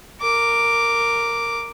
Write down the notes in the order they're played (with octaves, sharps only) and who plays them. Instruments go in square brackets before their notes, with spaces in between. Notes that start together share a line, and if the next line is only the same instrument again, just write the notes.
[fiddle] A#4 D6